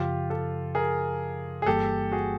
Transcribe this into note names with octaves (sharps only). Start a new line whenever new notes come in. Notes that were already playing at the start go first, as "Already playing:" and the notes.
Already playing: F#2 C#3 F3 F4 G4
G4 A4
G#4 A#4
G#4
G1 G2 E3 G3 A#3 G4 A4
F#4 G#4